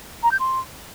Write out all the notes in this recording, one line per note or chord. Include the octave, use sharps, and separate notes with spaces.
A#5
G6
C6